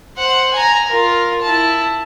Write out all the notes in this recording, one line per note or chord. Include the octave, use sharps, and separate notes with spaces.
C5 F#5
G#5 A#5
F4 A#4
E4 A5